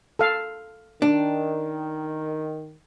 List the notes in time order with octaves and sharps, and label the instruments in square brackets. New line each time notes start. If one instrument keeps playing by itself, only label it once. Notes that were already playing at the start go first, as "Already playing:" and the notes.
[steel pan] A4 F5
[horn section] D#3 [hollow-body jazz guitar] D4